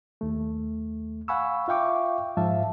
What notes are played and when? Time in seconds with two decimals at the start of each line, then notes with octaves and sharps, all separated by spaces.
0.21 D#2 A3
1.28 F5 F#5 G#5 B5 C#6 E6
1.68 F4 E5 F5 G5 C#6 D6
2.37 G#2 F3 E5 F5 A5